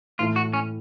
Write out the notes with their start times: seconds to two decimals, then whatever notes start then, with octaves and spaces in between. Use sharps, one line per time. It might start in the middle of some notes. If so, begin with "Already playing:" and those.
0.19 A2 E3 A3 F4
0.36 F#4
0.53 C#4